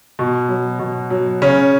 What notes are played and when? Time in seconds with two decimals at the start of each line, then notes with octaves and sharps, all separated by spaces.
0.19 B2
0.49 F#3
0.79 B2
1.10 F#3
1.42 C#3 C#4